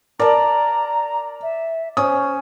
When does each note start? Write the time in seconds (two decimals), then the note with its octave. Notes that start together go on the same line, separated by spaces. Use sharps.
0.20 A#4 D5 A5 A#5
1.43 E5
1.97 C#4 C5 D#6